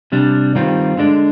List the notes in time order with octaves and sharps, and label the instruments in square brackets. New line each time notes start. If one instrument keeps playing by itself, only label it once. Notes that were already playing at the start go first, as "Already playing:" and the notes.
[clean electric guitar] C3 G3 D4
G2 D#3 G3 C4 F4
D3 G#3 D4